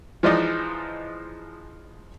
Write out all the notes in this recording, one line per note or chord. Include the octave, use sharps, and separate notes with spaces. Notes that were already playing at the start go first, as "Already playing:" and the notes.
E3 F3 G#3 D#4 D5 D#5